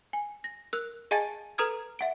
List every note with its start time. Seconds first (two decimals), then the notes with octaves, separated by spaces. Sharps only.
0.13 G#5
0.44 A#6
0.73 A#4 E6 F#6
1.11 G#4 D#5 F5 G#5 A5 A6
1.58 A4 B4 A#5 D#6 F6 G#6
1.99 E5 F#5 D7